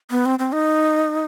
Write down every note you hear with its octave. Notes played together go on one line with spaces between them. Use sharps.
B3
C4
C4
D#4